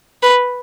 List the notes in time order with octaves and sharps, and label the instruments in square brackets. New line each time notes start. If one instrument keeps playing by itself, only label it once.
[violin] B4